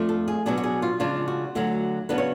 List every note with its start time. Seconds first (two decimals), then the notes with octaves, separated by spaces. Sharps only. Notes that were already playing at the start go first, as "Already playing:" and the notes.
Already playing: F2 F3 A3 D4
0.09 A4
0.28 G#4
0.46 B2 F#3 B3 D4 G#4
0.58 F#4
0.64 G#4
0.82 F4
1.00 C#3 F3 G#3 D4 F4
1.28 F#4
1.55 D2 D3 F#3
2.09 C#3 F#3 B3 D4 B4
2.18 C#5